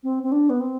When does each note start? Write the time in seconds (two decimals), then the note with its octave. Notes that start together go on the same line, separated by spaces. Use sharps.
0.03 C4
0.23 C4
0.32 D4
0.50 B3
0.60 C4